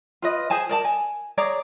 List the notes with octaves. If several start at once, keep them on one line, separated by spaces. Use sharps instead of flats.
F4 B4 D#5
G#4 C5 G#5 A5
A#4 D5 A5
G#5
G#4 C#5 D5 A#5